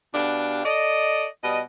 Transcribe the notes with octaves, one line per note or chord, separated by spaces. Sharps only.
B2 D4 G4 F5
A4 D5 D#5
B2 G3 D#5